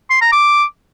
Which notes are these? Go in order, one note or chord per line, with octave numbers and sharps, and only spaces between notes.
C6
A#5
D6